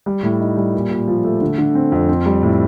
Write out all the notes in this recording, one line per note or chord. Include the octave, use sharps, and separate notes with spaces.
G3
A2
D#4
G3
A#2
A#2
F3
A3
D3
D3
C4
F2
C4
G3
A2